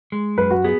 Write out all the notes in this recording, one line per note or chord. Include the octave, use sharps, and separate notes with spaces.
G#3
F#2 B4
F#4
B3 G#4